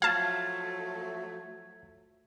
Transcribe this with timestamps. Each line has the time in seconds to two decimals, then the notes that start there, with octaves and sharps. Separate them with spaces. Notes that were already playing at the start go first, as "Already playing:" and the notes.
0.02 F3 F#3 A3 F5 A5 G#6